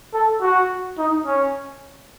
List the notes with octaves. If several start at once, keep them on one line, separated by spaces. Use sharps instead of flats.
A4
F#4
D#4
C#4